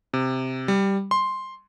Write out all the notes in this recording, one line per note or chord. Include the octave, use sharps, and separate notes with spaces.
C3
G3
C6